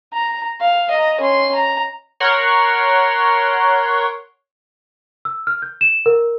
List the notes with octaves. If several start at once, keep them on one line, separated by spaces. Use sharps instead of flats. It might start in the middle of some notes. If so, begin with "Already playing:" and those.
A#5
F5
D#5 A#5
C#4 C6
A#5
A#4 C#5 F#5 C6
E6
F6
G6
E7
A#4